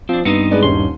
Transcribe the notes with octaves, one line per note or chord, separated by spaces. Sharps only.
F3 C4 D4
G2 B3 C4 D#4 C#7 D#7
G#3 B4 D5
D#1 C#4 D#4 C6